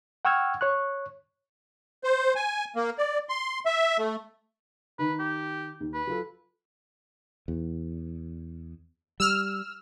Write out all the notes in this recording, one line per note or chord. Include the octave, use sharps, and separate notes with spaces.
F#5 G5 C#6 E6 F6 G#6
C#5 C#6 F#6
C5
G#5
A#3
D5
C6
E5
A3
D#3 D#4 B4
G4
D#2
B4
F#3 F4 A4
E2
G3 E6 F6